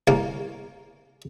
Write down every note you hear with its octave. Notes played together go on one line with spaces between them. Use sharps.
C2 A#3 F5